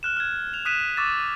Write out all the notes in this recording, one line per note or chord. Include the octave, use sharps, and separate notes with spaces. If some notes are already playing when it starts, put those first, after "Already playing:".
F6 F#6 E7
F6 G#6
F7
D#6 F#6 B6 D#7 E7
C#6 D6 E6 A6 E7